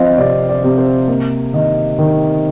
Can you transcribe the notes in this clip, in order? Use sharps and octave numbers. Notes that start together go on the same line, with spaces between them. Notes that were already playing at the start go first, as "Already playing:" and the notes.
Already playing: F3 C4 D#5 F5
C3 D5
D5
C3
C5
A#3
D#3 D#5
D#3